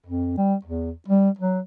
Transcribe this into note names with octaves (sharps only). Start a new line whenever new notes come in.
F2
G3
E2
G3
F#3